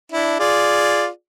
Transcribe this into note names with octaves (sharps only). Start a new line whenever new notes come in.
D4 E4
F4 G#4 D5